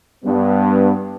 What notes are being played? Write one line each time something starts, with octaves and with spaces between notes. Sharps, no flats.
G2 B3